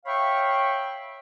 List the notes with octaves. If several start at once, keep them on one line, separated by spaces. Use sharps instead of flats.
C#5 E5 F5 G5 B5 C#6